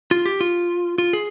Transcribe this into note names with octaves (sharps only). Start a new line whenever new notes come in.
F4
G4
F4
F4
G#4